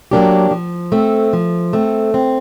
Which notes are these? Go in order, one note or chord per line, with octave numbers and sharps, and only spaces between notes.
F#3 A#3 D4 G4
F3
A3 C4
F3
A3 C4
C4